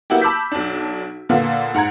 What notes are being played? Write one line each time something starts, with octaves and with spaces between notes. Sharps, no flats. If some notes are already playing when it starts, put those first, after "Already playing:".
A#3 B3 E4 F#4 G4
A5 B5 D6 E6 G6 B6
B1 D4
A#2 D3 B3 F4
G#2 F#5 A#5 G#6